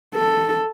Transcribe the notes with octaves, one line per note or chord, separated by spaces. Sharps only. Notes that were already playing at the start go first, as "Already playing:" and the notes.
A4